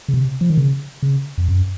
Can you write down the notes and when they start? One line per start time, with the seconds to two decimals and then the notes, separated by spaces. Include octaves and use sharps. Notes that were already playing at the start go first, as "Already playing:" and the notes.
0.08 C#3
0.14 C3
0.41 F3
0.50 D#3
0.58 C#3
1.03 C#3
1.38 F2
1.48 F#2